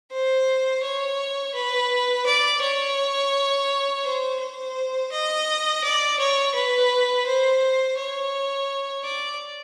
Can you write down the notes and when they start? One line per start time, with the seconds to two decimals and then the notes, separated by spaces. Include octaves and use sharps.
0.12 C5
0.83 C#5
1.54 B4
2.26 D5
2.61 C#5
4.04 C5
4.40 C5
5.12 D#5
5.83 D5
6.19 C#5
6.54 B4
7.26 C5
7.97 C#5
9.04 D5